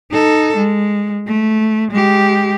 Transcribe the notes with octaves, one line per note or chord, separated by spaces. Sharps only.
D#4 A4
G#3
A3
G#3 G4